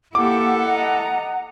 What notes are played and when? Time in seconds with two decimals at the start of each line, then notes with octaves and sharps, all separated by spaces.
0.15 A#3 E4 G4 A4 F#5 D6
0.66 D#5 A#5